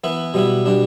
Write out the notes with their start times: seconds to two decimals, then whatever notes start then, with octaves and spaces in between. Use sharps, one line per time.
0.04 E3 B3 E4
0.34 B2 G3 B3 E4
0.66 B2 G3 D4